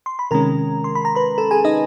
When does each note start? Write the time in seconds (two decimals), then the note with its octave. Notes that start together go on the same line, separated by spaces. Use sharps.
0.06 C6
0.19 B5
0.31 C3 D#3 G#3 C#4 A#4 A#5
0.84 C6
0.95 B5
1.05 A#5
1.15 B4 B5
1.38 A4 A5
1.51 G#4 G#5
1.64 D#4 D#5